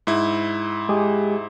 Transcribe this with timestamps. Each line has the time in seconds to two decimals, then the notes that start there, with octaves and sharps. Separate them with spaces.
0.07 G#2 E4
0.89 G#3 G4 G#4